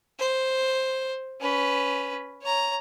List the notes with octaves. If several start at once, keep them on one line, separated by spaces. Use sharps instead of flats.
C5
C#4 B4
C#5 A#5